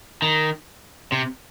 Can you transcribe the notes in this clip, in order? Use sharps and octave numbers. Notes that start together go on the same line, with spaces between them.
D#3
C3